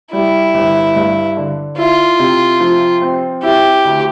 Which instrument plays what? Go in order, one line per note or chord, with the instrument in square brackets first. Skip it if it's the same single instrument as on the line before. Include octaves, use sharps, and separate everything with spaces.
[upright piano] G3 [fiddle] E4
[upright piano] G1
G2
D3
[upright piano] E4 [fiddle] F4
[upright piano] C3
F3
C4
[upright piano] E4 [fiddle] G4
[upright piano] D2